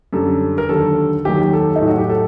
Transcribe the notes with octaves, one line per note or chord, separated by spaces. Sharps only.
F#2 D3 G3 A4
A#4
D#2 D3 F#3 A4
D#2 D#3 F#3 G4
G4
A4
D#4
A2 F#3
F#4
G4
A4